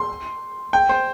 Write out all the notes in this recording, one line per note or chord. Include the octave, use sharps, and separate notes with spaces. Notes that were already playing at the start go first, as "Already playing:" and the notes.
Already playing: C6
G5
C5